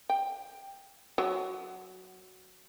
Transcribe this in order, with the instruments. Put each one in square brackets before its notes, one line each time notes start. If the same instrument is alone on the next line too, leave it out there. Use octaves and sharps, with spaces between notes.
[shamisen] G5
F#3